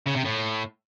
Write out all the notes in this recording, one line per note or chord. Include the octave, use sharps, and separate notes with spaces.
C#3
C3
A2